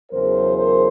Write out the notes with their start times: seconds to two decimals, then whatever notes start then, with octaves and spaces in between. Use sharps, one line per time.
0.11 E2 C#3 F#3 A#4 C5
0.56 A#4 C5